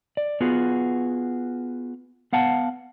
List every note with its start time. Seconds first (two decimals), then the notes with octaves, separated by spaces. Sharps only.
0.17 D5
0.41 B3 F4 F#4 G#4
2.33 B3 F5 F#5 A5